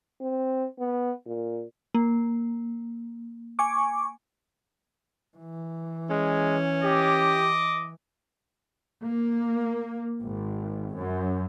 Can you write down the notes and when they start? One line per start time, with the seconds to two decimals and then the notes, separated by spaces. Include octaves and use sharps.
0.21 C4
0.79 B3
1.26 A#2
1.94 A#3
3.59 G#5 C#6 D6
5.38 E3
6.10 G#3 C#4
6.83 G4 D#5 D6
9.04 A#3
10.21 G#1
10.95 F#2